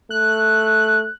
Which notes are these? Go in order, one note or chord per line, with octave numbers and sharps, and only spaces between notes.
A3 F#6